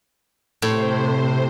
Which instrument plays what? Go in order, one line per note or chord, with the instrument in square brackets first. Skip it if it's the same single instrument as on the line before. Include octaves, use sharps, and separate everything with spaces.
[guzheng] A2 [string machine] C3 C5